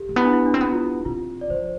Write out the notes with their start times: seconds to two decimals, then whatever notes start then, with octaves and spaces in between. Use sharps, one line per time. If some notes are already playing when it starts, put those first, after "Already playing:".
Already playing: G4 A4
0.09 A3
0.16 B3 E4
0.25 D4
0.33 E4
0.46 D4
0.54 C4
0.61 B3
0.71 F4
0.75 E4
1.05 C3 F4
1.41 D5
1.50 F3 C5